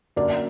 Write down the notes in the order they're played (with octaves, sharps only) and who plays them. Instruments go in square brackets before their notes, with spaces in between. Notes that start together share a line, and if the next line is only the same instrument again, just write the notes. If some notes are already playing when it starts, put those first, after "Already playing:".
[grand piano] F#2 D3 F#3 A#3 [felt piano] D5